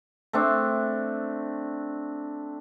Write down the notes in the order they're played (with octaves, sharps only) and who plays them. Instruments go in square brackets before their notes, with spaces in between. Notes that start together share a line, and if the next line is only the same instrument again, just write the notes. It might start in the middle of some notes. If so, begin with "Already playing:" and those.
[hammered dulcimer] A3 C4 D4